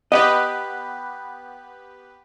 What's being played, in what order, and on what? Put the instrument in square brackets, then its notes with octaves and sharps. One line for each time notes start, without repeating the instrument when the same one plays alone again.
[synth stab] B3 G4 B4 [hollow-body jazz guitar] D#5